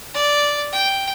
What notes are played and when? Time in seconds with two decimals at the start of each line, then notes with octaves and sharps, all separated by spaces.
0.14 D5
0.73 G5